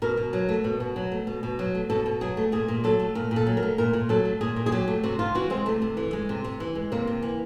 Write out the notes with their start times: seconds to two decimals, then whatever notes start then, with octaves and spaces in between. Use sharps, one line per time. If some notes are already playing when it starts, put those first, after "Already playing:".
0.02 B2 A#4
0.17 B2
0.33 F#3
0.49 A3
0.64 B2
0.80 B2
0.96 F#3
1.12 A3
1.27 B2
1.43 B2
1.59 F#3
1.75 A3
1.90 B2 A4
2.06 B2
2.21 F#3 G#4
2.37 A3
2.52 A#2 G#4
2.68 A#2
2.84 F#3 A4
3.00 A3
3.15 A#2 A#4
3.31 A#2
3.36 A4
3.46 F#3
3.57 A#4
3.62 A3
3.78 A#2 A#4
3.93 A#2
4.09 F#3 A4
4.25 A3
4.41 A#2 G#4
4.56 A#2
4.66 G#4
4.72 F#3 G4
4.88 A3
5.03 C3 F#4
5.19 C3 F4
5.35 E3 F#4
5.50 G#3 C4
5.66 C3 A3
5.82 C3
5.97 E3
6.13 G#3
6.29 C3
6.44 C3
6.60 E3
6.75 G#3
6.92 C3 A#3
7.07 C3
7.22 E3